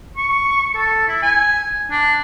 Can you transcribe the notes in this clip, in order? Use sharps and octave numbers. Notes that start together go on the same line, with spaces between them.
C#6
A4
E4
G#5
D4